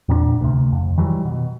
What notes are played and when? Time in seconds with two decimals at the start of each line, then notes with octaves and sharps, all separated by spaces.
0.09 E2 A#2 B3 D4
0.41 D2 C3
0.73 F2
0.98 D#3 E3 F#3 G3
1.25 B2